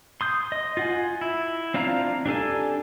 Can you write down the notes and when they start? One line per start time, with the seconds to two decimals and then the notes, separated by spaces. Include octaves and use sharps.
0.21 C6 D#6 G6
0.52 D#5
0.77 F4 F#5 G#5
1.21 E4
1.74 C4 D4 F4 F5 A#5
2.26 D4 G4 A4 G#5